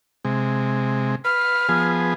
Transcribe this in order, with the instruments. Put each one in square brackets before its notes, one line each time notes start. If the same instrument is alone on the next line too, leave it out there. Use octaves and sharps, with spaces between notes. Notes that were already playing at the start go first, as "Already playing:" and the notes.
[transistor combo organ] C3 G#3
[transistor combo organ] B4 [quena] F6
[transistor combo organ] F3 B3 G#4